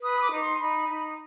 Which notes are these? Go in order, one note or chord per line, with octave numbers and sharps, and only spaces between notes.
B4 D#6
D6
D#4
C6
C6
D#4 B5
D#4